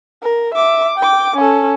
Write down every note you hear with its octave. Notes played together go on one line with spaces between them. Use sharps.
A#4
E5 D6
G5 D6
C#4 A4